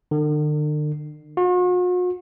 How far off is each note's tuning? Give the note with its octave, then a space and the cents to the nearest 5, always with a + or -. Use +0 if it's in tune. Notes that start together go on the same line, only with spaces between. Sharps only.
D3 +45
F#4 -45